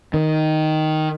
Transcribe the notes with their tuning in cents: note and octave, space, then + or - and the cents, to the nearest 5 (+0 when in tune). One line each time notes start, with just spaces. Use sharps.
D#3 +0